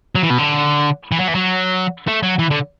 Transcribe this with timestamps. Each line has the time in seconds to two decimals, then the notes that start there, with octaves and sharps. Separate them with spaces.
0.15 F#3
0.23 E3
0.30 B2
0.38 D3
1.12 E3
1.19 F#3
1.28 E3
1.35 F#3
2.08 A3
2.23 F#3
2.39 E3
2.51 D3